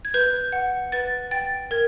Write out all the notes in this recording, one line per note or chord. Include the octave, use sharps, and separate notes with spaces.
G#6
B4 G6
F#5
B4 A6
G5 A6
A#4 G#6